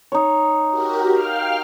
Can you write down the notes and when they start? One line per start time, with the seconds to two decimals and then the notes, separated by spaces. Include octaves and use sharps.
0.12 D#4 C#5
0.70 F#4 G4 A#4
1.09 F5 G5 F6